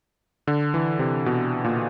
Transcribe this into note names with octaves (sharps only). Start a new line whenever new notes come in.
D3
E3
C3
B2
A#2